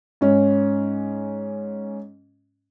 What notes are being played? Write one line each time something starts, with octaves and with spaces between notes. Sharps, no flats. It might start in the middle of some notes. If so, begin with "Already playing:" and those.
G#2 C#4